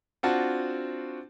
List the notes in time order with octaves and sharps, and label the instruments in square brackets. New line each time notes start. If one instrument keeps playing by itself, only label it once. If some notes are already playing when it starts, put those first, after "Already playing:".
[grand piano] C4 D4 F4 F#4 F#5 A5